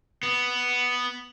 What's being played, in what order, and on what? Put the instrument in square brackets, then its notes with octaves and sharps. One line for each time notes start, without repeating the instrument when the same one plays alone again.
[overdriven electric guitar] B3